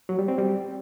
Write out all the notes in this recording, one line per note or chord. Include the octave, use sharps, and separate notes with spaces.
F#3
G3
C4
G3